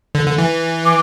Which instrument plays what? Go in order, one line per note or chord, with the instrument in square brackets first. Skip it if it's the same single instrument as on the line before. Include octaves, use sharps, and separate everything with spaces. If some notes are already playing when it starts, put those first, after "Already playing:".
[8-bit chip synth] D3
D3
E3
[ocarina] D6